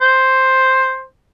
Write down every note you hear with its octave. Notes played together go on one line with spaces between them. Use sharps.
C5